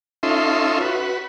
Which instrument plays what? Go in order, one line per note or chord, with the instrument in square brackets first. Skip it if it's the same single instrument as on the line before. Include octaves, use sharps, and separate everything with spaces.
[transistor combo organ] C#4 D#4 F4 A4 E5 C6
F#4 B4